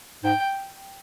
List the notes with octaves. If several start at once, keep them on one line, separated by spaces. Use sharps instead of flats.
G#2 G5